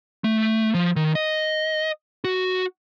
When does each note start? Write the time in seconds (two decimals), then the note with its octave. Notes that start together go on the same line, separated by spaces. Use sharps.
0.24 A3
0.74 F3
0.96 D#3
1.15 D#5
2.24 F#4